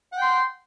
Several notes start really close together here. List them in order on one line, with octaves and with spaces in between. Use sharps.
F#5 G5 C6